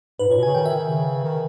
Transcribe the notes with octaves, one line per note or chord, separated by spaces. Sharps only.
G#2 B4
A#2 C#5
B2
C#3 G#5
D#3 G5
E5
C#3
D#3